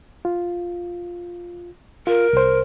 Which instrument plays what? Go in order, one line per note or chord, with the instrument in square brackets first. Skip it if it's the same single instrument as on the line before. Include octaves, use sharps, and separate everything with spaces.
[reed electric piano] F4
[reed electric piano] F4 [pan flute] A#4
[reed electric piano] C2 C5